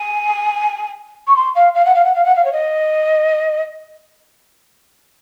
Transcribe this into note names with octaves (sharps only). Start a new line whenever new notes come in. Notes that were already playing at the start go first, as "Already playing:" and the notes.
Already playing: G#5
C#6
C6
F5
F5
F#5
F5
F#5
F5
F#5
F5
C#5
D#5